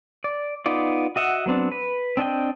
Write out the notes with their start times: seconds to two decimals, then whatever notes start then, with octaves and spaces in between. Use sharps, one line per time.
0.24 D5
0.66 B3 D#4 F4 D5
1.16 F#4 D#5 E5 F#5
1.46 F#3 B3 C4 D4
1.72 B4
2.17 C4 D4 D#5 G5